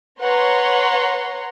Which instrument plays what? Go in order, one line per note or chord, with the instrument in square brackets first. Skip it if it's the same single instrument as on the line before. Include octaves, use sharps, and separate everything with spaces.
[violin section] B4 C#5 F#5 A#5 C6